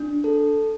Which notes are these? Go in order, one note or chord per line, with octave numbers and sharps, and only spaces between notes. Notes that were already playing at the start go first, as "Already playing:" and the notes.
Already playing: D4
A4